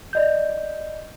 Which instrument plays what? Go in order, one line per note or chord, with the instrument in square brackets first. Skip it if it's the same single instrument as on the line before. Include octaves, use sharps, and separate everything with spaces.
[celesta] D5 D#5 G6